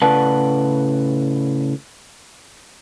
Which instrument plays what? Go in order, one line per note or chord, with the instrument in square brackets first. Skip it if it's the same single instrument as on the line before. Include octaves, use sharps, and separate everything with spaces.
[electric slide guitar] A2 C#3 B4 D5 F#5 A5